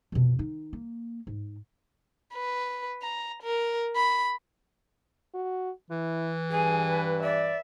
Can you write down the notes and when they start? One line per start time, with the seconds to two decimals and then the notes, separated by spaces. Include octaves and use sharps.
0.12 F2 B2
0.39 D#3 D#4
0.73 A#3
1.27 G#2
2.34 B4
3.02 A#5
3.43 A#4
3.96 B5
5.34 F#4
5.90 E3 E4
6.51 G2 G#4 G#5
6.89 B4
7.23 D5 E5